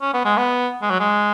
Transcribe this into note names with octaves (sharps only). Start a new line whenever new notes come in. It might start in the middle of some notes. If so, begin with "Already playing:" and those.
C#4
B3
G#3
B3
G#3
F#3
G#3